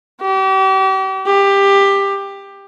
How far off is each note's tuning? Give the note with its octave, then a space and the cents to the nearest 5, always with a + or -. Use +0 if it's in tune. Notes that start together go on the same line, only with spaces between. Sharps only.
G4 -40
G4 +15